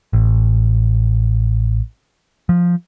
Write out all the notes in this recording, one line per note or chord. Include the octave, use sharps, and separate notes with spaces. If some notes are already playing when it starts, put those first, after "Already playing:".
A1
F3